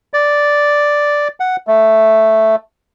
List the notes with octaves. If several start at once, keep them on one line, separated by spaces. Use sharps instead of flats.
D5
F#5
A3